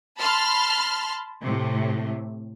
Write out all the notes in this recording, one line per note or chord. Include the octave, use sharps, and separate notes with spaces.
A5 B5 C6 F6
A2 C3